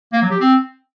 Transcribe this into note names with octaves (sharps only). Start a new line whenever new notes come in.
A#3
F#3
G4
C4